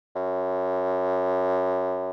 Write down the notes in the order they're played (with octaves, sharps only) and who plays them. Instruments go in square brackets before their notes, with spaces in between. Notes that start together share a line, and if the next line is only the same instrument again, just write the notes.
[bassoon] F#2